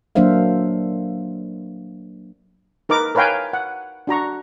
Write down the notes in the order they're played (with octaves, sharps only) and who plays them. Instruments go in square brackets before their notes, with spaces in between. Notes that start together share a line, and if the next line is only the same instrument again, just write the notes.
[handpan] F#3 A#3 D4 C5 E5 F5
[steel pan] D#4 A#4 B4 D6
A#4 B4 C#5 F5 G5 G#5
F#5
D4 F#4 A#5 C#6